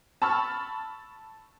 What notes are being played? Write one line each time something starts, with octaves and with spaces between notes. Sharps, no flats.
A5 B5 C#6 E6 F6 A6